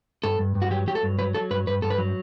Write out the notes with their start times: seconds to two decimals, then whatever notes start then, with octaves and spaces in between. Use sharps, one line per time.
0.24 G2 A4
0.39 G2
0.55 G2
0.62 F#4
0.71 F#3 G4
0.87 F#3 G4
0.95 A4
1.03 G2
1.19 F#3 B4
1.34 F#3 A4
1.50 G2 B4
1.67 G2 B4
1.82 G2 A4
1.90 B4
1.98 F#3